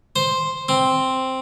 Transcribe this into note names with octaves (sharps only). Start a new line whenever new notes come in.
C5
C4